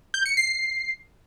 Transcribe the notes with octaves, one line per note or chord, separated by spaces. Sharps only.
G6
C#7
C7